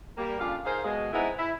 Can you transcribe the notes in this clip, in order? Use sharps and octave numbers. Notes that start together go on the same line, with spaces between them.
G3 A#3
F2 C#3 D4 F4 F5
D#4 G#4 A#4 C5 F5
B2 G#3
G#3 B3 C4 D#4 E4 F#4
E4